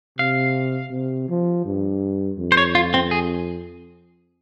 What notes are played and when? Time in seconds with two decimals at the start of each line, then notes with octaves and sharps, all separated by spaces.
0.18 C3 F5
0.92 C3
1.29 F3
1.65 G2
2.39 F2
2.52 C5
2.57 C#5
2.75 F4
2.94 C4
3.11 G#4